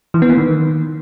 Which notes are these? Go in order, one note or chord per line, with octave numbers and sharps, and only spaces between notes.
E3
B3
A#3
D#3